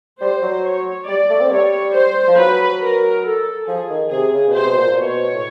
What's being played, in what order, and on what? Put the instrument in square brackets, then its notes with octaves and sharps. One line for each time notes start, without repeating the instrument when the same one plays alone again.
[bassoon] G3 [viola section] C5
[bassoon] F#3
[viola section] C#5
[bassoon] G3 [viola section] D5
[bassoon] A3
C4
[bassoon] G3 [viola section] C#5
[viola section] C5
[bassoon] F3
[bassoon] F#3 [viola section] B4
[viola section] A#4
A4
[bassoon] F3 [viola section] G#4
[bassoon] D#3
[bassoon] C3 [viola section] G#4
[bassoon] C#3
B2
[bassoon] C3 [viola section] C5
[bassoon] B2
A#2
A#2
[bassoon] B2 [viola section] C#5
[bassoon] A2